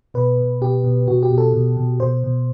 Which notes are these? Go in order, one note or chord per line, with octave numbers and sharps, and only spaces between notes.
B2 B4
B2
B2 G4
B2
B2 F#4
G4
B2
A4
B2
B2
B2 C5
B2